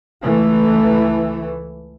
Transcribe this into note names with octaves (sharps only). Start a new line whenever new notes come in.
C#2 E3 A3